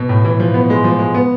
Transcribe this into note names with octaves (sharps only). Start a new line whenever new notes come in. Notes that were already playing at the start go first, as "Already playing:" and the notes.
Already playing: B2
A2
E3
F3
B3
G#3
F3
G#3
B3